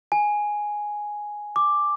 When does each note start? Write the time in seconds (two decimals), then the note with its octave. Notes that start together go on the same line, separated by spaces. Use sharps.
0.12 G#5
1.56 D6